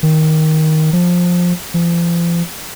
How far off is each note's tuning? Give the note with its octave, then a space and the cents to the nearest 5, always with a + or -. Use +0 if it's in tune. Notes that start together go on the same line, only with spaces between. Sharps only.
D#3 +10
F3 +15
F3 -40